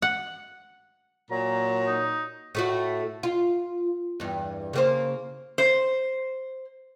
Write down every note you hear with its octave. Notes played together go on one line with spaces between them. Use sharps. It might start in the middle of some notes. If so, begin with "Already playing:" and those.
F#5
A#2 F#3 A#5
D#4
A2 A3 F#4
F4
E2 G2
C#3 A#3 C5
C5